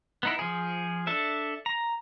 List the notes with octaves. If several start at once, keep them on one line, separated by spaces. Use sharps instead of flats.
B3 D#4 E4
F3 G#4
D4 A4 E5
A#5